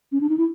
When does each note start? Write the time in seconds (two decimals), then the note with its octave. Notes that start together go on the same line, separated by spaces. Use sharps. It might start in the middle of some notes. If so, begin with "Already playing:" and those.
0.12 C#4
0.21 D4
0.29 D#4
0.38 E4